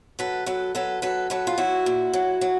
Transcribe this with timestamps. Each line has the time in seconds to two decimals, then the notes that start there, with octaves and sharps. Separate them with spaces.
0.19 F#3 A4 B4
0.46 F#3 A4 B4
0.75 F#3 A4 B4
1.02 F#3 A4 B4
1.30 F#3 A4 B4
1.47 F4
1.58 F#3 E4 F#4
1.86 A#2
2.13 F#3
2.41 F#3